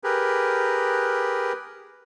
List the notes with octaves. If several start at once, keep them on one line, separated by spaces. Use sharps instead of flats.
G4 G#4 A#4 B4